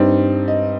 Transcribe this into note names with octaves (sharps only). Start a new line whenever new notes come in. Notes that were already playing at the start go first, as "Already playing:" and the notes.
Already playing: G2 G3 C4 D#4
D#5